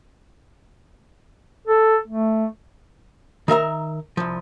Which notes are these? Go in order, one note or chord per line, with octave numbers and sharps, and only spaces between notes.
A4
A3
D#3 A#4 E5 A#5
C2 F3